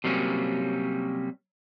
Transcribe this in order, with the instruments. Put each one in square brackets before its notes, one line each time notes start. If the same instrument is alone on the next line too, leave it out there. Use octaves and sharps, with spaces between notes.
[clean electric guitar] C3 F#3 G3 A#3 C#4